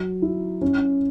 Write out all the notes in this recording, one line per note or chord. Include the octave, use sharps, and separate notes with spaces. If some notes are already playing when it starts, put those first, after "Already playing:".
Already playing: F#3
E4
C#4